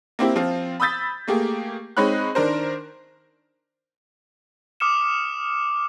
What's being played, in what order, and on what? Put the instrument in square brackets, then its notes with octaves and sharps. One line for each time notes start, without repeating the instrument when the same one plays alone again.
[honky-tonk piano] A#3 C4 E4 G4
F3 C4 F4
B5 D#6 E6 G6 A6 B6
A3 A#3 G4 G#4
G#3 C4 D#4 C#5 B5 F#6
D#3 D4 A#4 C5
[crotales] D6 D#6 F6 C#7 E7